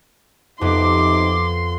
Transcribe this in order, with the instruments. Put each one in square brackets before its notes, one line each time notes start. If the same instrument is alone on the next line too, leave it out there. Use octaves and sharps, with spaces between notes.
[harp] F2 B3 [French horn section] C3 D#4 [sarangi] C6 [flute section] D6